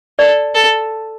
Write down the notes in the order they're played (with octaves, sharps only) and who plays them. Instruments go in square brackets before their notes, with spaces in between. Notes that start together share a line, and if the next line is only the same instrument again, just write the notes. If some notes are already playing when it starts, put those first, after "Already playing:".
[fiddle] A4 [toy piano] D5
[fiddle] A4